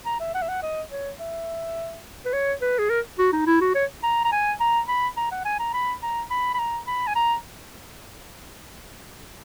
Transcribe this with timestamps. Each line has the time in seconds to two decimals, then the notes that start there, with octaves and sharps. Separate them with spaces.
0.06 A#5
0.20 E5
0.35 F#5
0.42 E5
0.49 F#5
0.63 D#5
0.91 C#5
1.20 E5
2.26 B4
2.33 C#5
2.62 B4
2.79 G#4
2.90 A#4
3.19 F#4
3.32 D#4
3.47 E4
3.61 F#4
3.75 C#5
4.03 A#5
4.25 A#5
4.32 G#5
4.60 A#5
4.88 B5
5.17 A#5
5.32 F#5
5.45 G#5
5.60 A#5
5.74 B5
6.03 A#5
6.31 B5
6.55 B5
6.59 A#5
6.87 B5
7.07 G#5
7.16 A#5